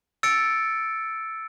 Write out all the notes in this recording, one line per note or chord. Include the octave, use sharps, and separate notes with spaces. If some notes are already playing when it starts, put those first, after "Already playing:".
E6 A6 C#7 D7